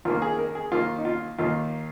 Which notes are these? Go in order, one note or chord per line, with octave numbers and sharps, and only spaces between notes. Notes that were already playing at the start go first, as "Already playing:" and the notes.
D#2 D#3 A#3 F4
G#4
A#4
G#4
D#2 D#3 A#3 F4
D#4
F4
D#2 D#3 A#3 F4